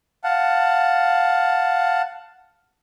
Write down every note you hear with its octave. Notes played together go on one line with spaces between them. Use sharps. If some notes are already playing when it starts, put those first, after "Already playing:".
F5 F#5 A5